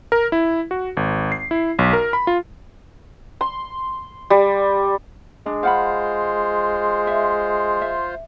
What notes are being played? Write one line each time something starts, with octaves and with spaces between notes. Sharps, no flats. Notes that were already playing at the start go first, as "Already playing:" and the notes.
A#4
E4
F#4
G#1
C7
E4
B1
A#4
B5
F4
C6
G3
G#3 D4
F4 C5 F5 F#5 B5
E5
E5